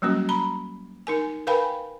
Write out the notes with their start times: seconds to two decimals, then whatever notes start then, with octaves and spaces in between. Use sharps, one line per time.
0.02 F#3 G3 A#3 C#4 F#4
0.29 A#5 B5
1.07 D#4 A#4 G#5
1.47 A#4 B4 F5 G5 G#5 B5